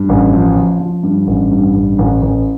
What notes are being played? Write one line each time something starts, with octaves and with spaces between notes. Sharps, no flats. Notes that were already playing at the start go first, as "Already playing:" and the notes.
Already playing: G2
A1
F3
F3
F3
G2
A1
G2
A1
A1
A1